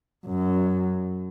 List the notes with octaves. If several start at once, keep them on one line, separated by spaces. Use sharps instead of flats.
F#2